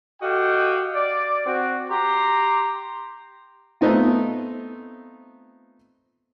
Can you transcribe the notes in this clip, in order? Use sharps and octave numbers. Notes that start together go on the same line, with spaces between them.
F#4 G4 A4 D#5 F5 G5
D5
C4 F#4
G4 A#5 C6
A3 B3 C4 D#4 F4